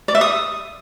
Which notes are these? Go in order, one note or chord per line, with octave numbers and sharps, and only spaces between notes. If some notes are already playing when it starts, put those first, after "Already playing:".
D5
E5
D#6